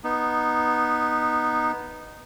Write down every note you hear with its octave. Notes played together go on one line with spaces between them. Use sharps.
B3 D#4